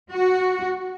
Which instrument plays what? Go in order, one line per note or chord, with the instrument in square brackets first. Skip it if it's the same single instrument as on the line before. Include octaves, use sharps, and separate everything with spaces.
[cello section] F#4